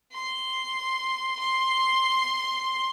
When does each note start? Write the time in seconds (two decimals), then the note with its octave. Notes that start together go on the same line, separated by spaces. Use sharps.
0.13 C6
1.39 C6